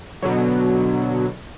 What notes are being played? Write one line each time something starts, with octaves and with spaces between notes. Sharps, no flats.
B2 D3 F#3